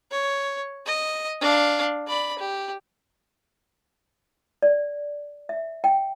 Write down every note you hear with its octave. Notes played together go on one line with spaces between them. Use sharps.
C#5
D#5
D4 F5
D5 B5
G4
D5
E5
G5